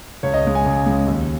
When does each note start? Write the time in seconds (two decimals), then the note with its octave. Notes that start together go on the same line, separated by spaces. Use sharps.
0.23 C#2 C#5
0.34 D#5
0.44 C#3 G#3
0.55 G#5
0.66 C#2
0.86 C#3 G#3
1.07 D#2